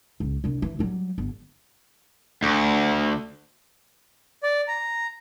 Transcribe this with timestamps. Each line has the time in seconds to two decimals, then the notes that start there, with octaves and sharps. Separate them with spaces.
0.20 C#2
0.44 C2 D4
0.62 E3
0.79 F#3 G3
1.18 G1
2.43 D2
4.43 D5
4.68 A#5